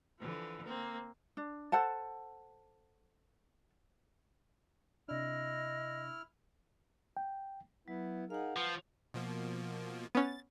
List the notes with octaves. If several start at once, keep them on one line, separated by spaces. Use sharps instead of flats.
D3 E3 F3
A#3 C4
D4
A4 C5 F#5 A5
C3 D4 E4 D#5 F6
G5
F#3 B3 E4
D#4 G#4 A#4 F5 F#5
F3 B4
B2 F3 A#3
B3 C#4 A6